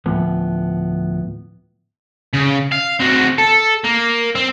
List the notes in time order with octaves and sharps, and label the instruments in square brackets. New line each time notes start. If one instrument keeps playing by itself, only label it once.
[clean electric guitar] D2 A2 F3 B3
[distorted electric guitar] C#3
F5
C4 F#4
A4
A#3
C4